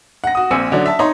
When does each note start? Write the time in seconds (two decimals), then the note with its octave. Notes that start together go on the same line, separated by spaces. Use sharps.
0.24 F#5 A#6
0.35 F#4 D#6
0.51 A#1 C4 G#5 E6 C#7
0.72 D3 F#3 C#4 D4
0.86 E5 A5
0.99 D#4 C#5 C6